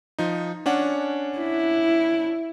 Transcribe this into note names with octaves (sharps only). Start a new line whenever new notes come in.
F3 D#4
C#4 D4 F#5
E4